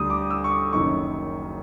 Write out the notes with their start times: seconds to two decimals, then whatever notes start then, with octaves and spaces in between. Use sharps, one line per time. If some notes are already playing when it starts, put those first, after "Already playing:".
Already playing: D2 D3 G3 D#6
0.10 D6
0.30 E6
0.44 C#6
0.52 D6
0.73 F#1 F#2 D#3 C#6